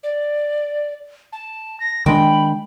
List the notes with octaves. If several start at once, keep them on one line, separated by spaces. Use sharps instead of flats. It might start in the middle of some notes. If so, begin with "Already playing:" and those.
D5
A5
A#6
D#3 G#3 D4 G5 B5